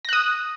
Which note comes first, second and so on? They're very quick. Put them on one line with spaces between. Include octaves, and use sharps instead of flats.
A#6 F#6 D#6